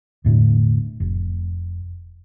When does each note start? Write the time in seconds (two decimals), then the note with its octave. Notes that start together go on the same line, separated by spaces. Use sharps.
0.25 E1 A2 D3
1.00 F1